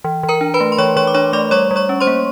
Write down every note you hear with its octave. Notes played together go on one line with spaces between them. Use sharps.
E3
E3
A#4 A#5
D4
B4 B5
A3
C6
E3 C#5 C#6
E3 C#5 C#6
D6
D4 C#5 C#6
A3 D5 D6
G3 C#5 C#6
G3
C#5 C#6
C#4
C5 C6
A#3